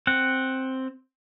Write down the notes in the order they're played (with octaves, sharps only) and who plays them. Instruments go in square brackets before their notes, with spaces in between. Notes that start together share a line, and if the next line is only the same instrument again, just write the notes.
[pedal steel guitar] C4 F#5